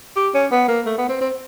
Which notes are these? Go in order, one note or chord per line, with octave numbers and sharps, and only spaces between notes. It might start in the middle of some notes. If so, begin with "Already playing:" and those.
G4
C#4
B3
A#3
A3
B3
C4
C4